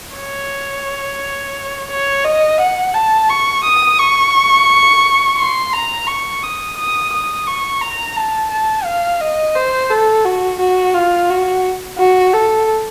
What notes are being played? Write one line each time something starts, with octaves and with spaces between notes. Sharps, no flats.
C#5
C#5
D#5
F#5
A5
C#6
D#6
C#6
C6
A#5
C#6
D#6
D#6
D#6
C#6
A#5
A5
A5
F5
D#5
C5
A4
F#4
F#4
F4
F#4
F#4
A4